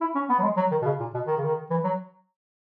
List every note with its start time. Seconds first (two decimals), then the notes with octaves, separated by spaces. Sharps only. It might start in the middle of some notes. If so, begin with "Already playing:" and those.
0.01 E4
0.15 C#4
0.29 B3
0.39 F#3
0.43 G#3
0.57 F#3
0.71 D#3
0.82 B2
0.85 C#3
1.00 A#2
1.14 B2
1.27 D#3
1.37 C#3
1.45 D#3
1.70 E3
1.84 F#3